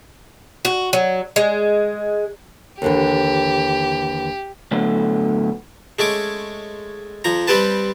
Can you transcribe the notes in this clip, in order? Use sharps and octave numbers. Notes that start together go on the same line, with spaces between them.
F#4
F#3
G#3
D#2 D3 E3 G4
A2 D3 F#3 A3 B3
G#3 A3 C#4 D6
F2 F3 A#5
G3 C4 G4 B4 A5